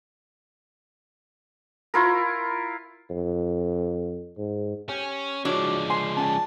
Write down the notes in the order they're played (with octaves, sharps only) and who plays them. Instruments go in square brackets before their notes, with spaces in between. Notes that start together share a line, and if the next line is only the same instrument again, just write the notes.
[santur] E4 F4 A#4
[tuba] F2
G#2
[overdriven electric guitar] C#4 [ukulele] G4
[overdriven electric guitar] F3 G#3 [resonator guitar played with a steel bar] D4 [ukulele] E4 F#4 C#5
[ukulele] G#5 [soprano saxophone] C6
[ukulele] C#4 G#5 [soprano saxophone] A5